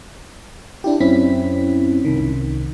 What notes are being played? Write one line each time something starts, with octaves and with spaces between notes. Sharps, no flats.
D4 E4 G4
F#2 C4 C#4 E4 B6
C2 D#3